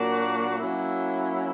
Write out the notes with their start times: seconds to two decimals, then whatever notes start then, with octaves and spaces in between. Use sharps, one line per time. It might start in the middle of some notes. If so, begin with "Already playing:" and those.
Already playing: A#2 F#3 A#3 D4 F#4
0.60 F#3 A#3 C#4 E4